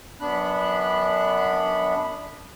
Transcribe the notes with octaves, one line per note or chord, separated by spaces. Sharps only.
F#2 B3 D4 B5 F#6